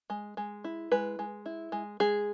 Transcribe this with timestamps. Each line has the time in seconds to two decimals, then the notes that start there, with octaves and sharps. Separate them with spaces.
0.10 G#3
0.37 G#3
0.64 E4
0.92 G#3 B4
1.19 G#3
1.46 E4
1.72 G#3
2.00 G#3 G#4